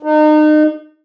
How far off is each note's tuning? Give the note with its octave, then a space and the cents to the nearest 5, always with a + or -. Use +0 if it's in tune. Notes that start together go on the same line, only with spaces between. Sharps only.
D#4 -35